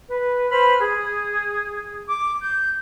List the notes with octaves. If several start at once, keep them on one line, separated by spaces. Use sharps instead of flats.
B4
B4 C5 B5 F6
G#4
D6
G6